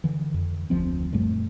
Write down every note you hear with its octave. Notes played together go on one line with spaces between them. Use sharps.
D3 E3
F2
F1 D2 F3 C4
F#2 A#2 G3 A3